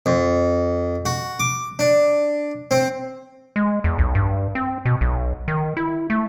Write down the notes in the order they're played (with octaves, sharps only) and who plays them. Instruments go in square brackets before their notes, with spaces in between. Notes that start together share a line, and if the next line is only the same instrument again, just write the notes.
[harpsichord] F2
F#4
D6
D4
C4
[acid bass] G#3
E2
B1
G2
C4
B2
B1
D#3
E4
A3